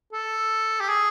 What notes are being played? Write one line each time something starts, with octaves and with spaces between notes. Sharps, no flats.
A4
G4
G#4